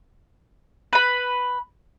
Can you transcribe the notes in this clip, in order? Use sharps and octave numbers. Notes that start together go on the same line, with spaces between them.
B4 B5